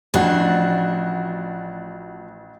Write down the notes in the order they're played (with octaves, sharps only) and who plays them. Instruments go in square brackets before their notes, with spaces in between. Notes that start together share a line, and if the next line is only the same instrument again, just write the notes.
[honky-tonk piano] A1 F#4 [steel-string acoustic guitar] F3 D4